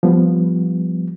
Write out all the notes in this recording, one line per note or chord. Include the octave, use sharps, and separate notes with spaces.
F3 G3 B3